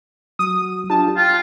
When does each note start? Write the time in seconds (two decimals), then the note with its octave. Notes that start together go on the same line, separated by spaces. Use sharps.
0.39 F#3 D#6
0.90 D4 F4 G4 A5
1.17 F4 G5